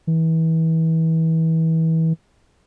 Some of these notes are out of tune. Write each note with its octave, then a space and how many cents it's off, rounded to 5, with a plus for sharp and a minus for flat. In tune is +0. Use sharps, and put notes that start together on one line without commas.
E3 -30